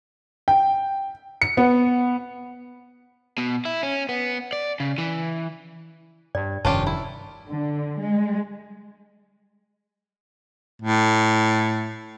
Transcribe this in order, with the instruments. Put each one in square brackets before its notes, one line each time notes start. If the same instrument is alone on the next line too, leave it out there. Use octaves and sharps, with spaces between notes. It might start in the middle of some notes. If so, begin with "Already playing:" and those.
[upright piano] G5
C#7
B3
[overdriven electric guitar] B2
E4
C#4
B3
D5
C#3
E3
[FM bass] G2 [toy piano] D5
[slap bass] F1 D#3 [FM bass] G2 [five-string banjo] C#4 F4 G4 [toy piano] A5
[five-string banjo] E4
[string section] D3
G#3
[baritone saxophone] A2